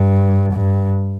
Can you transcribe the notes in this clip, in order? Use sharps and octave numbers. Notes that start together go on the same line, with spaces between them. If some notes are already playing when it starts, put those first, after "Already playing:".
Already playing: G2
G2